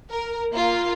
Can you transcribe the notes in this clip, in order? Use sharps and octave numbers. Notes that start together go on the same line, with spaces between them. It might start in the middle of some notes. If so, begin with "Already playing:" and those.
A#4
A#3 F4